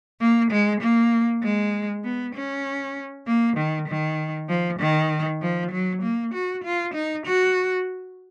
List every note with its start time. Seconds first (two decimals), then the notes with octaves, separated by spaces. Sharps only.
0.21 A#3
0.51 G#3
0.81 A#3
1.42 G#3
2.04 B3
2.35 C#4
3.27 A#3
3.57 D#3
3.88 D#3
4.49 F3
4.80 D#3
5.42 F3
5.71 F#3
6.02 A#3
6.34 F#4
6.64 F4
6.94 D#4
7.26 F#4